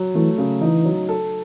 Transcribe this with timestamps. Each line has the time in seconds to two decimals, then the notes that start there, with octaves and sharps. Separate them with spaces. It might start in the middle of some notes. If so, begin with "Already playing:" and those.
Already playing: F#3
0.15 E3 A3
0.38 C#3
0.61 E3 D#4
0.85 F#3
1.09 A4